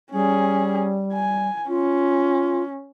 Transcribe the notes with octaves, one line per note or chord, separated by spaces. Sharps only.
G3 C#4 G#4
G#5
C#4 F4